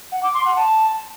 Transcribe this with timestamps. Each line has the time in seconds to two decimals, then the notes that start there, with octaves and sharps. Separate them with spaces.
0.12 F#5
0.23 D6
0.34 C6
0.45 F#5
0.56 A5